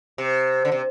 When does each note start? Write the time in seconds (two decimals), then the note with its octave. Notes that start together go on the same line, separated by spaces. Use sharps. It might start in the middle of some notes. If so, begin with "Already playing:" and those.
0.18 C3
0.65 D3
0.72 C3